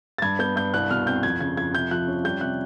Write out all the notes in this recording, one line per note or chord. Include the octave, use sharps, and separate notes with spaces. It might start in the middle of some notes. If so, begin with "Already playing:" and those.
A6
G2 G#6
B3 G6
G2 G6
C2 F#6
B2 F6
C4 G6
F2 G#6
C#3 G#6
F2 G#6
C3 G6
F3 F#6
C#4
G3 G6
C3 F#6